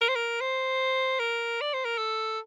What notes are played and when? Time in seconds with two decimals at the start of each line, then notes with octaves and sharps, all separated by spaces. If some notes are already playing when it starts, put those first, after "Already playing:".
0.01 A#4
0.08 C5
0.15 A#4
0.41 C5
1.19 A#4
1.61 D5
1.74 C5
1.85 A#4
1.98 A4